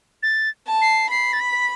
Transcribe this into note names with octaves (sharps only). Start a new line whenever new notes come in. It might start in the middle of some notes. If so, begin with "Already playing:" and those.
A6
A5
C7
B5 C7
A6
B6